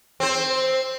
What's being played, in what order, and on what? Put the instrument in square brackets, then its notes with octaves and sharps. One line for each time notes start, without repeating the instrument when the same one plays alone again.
[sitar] C4 C5